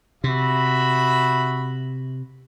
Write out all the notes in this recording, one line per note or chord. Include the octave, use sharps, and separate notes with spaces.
C3 F#4 E5 B5